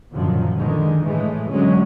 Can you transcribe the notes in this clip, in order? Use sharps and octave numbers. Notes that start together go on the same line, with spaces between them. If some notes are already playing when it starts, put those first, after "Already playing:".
F#2 A#2 D3 D#3 F3 F#3
D3 D#3 G#3
A2 E3 G#3 A3
D3 F#3 G#3 C#4